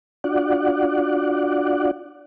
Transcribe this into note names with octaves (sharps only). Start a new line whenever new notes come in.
D4 F4 F#4 D5 F#5